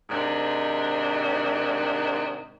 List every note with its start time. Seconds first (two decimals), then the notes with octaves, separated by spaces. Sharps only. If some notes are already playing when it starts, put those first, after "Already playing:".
0.10 G#2 C3 D#3 D4